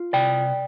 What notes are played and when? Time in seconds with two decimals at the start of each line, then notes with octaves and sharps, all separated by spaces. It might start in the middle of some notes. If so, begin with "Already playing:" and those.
Already playing: F4
0.13 C3 D5 G5